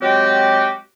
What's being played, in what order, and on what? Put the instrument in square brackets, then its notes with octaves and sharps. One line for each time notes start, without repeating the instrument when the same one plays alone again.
[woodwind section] F#3 G#3 C4 F#4 G4